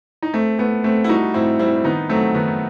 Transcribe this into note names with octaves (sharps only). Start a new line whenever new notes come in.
D#4
A3 C4
A3 B3
A3 C4
E4
G3 D#4 F#4
A2 C4 E4
G3 C4 E4
C4
D#3 B3 D#4
F#3 A3 C4
D#3 B3